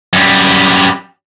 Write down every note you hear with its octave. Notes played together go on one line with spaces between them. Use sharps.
F#2 G3